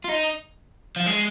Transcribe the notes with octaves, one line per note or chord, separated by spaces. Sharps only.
F4
D#4
F3
G#3